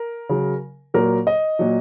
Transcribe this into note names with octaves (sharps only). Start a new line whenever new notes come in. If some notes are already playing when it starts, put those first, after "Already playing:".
Already playing: A#4
C#3 F#3
A#2 F#3 A#4
D#5
A#2 F#3